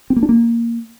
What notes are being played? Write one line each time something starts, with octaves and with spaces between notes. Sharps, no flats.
C4
A#3
D4
A#3